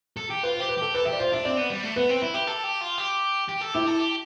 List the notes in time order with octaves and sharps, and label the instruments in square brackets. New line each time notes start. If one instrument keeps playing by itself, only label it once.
[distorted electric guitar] A4
G4
[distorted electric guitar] F4 [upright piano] B4
[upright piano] C5
[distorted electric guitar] G4
[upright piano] B4
[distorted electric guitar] G4 [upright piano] A4
[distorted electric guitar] A4 [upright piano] B4
[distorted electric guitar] G4 [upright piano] E5
[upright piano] D5
[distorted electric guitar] F4 [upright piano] C5
[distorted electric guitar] D4 [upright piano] E5
[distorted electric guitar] C4 [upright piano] D5
[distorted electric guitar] B3
G3
A3
[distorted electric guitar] B3 [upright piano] B4
[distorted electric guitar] C4
E4
G4
A4
G4
F4
G4
G4
A4
[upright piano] E4 [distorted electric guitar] G4
[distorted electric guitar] A4
G4